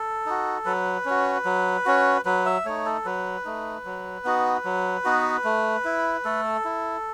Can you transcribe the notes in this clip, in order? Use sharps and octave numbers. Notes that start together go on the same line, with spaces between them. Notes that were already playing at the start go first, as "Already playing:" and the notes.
Already playing: A4
D#4 F#4
F#3 B4
C#4 F#4
F#3
C#4 F#4
F#3 B4
E5
A3 D#4 C#5
A4
F#3 B4
A3 D#4
F#3
B3 D#4 F#4
F#3
B3 D#4 F#4
A3
E4
A3 A4
E4